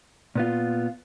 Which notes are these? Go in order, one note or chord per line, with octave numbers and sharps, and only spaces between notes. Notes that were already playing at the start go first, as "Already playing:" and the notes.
A#2 B3 F4